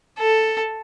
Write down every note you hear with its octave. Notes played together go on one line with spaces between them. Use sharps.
A4